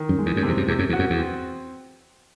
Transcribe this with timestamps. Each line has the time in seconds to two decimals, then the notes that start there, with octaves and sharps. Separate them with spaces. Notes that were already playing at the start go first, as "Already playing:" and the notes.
Already playing: D#3
0.09 F#2
0.18 G#3
0.26 E2
0.36 F#2
0.43 E2 C3
0.57 F#2
0.68 E2 C3
0.79 F#2
0.89 E2 F#4
0.99 F#2
1.10 E2
1.18 C4